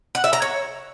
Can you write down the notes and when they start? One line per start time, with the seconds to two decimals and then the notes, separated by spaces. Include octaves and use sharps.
0.15 F#5
0.24 E5
0.33 A#5
0.42 C#5